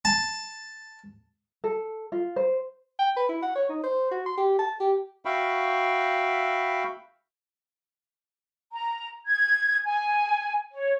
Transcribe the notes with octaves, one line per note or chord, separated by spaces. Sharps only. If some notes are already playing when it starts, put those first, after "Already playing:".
A5
A4
F4
C5
G5
B4
E4
F#5
C#5
D#4
C5
F#4
C6
G4
A5
G4
F#4 E5 F5 G5 B5 C#6
A#5
G#6
G#5
C#5